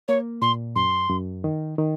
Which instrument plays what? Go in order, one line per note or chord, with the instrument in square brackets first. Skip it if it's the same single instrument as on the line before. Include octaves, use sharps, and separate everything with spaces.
[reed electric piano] A#3 [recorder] C#5
[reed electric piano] A#2 [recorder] C6
[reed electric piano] F#2 [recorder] C6
[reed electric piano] F#2
D#3
D#3